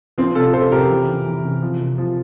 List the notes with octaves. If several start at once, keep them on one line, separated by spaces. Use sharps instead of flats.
F3 C4
C3 F4 A4
F3 A4 C5
C3 G4 A#4
E3
C3
E3
C3
F3
C3
F3